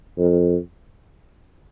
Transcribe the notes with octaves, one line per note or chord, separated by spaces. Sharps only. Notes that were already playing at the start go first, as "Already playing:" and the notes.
F2